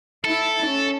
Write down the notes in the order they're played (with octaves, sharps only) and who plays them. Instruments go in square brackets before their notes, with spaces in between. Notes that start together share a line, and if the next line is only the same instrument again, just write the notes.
[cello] E4 [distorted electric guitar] A4
[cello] C#4